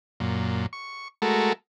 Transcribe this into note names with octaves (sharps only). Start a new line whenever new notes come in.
F#2 A#2
C#6
G#3 A3 F#4 A4 A#4